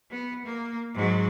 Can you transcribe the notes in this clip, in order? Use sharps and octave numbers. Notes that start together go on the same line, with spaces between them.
B3
A#3
G#2 F#3